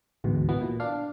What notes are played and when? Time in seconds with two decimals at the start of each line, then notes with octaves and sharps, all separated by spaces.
0.24 A1 D2 G#2 B2
0.49 B2 E3 B3
0.61 A#2
0.80 D4 F5